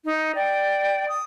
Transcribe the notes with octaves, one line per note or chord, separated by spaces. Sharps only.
D#4
D5 G5
D#6